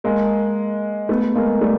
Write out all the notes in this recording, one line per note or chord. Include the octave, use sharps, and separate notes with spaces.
G#3 A#3
A3 B3
G#3 A#3
G3 A3